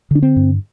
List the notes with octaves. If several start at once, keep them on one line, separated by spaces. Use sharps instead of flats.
D3 D4
C4
G2